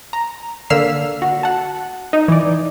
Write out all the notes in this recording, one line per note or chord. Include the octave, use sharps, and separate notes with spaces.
A#5
D3 A#3 E6 F6 B6 C7
F#4
F#5 A5
D#4
E3 D5